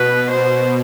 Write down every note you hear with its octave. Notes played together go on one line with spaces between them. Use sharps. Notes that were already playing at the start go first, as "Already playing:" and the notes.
Already playing: B2 B4
C5